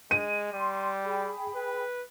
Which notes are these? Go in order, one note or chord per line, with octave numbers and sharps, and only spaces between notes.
G#3 D#7
G3 C6
G#4 G5 B5
B4